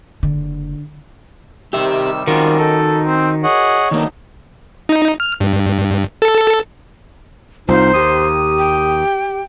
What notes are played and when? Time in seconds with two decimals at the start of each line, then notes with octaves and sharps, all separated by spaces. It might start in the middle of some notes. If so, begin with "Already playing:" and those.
0.23 F#1 D3
1.73 C3 D#3 G3 G4 E5 E6
2.27 D#3 G#3 C4 F4 F#4 A#4
2.59 D#4 A4
3.06 C4
3.43 G#4 C#5 D#5 F#5
3.91 D#3 F#3 A#3 D4 D#4
4.89 D#4
5.20 F6
5.40 G2
6.22 A4
7.68 C2 D#4 F4 C5
7.94 D#2 G4 D#6
8.59 G5